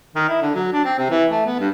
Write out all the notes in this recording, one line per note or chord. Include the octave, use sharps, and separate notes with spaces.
D#3
E4
D3
F#3
D4
C4
C3
E3
A3
B3
G2